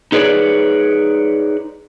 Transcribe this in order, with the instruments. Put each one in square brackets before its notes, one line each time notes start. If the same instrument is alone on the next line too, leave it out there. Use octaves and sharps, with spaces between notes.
[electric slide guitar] D#4 G#4 B4 C#5 D5